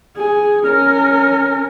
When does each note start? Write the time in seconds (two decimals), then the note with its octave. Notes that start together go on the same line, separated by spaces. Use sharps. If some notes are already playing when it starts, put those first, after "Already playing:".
0.17 G#4
0.65 C#4 A#4